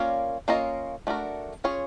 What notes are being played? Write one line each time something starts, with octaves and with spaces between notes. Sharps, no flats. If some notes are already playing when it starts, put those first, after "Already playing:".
Already playing: A#3 C#4 F4 A#4 D5
A#3 C#4 F4 A#4 D#5
A3 D4 F#4 A#4
C#4 F4 G#4 C#5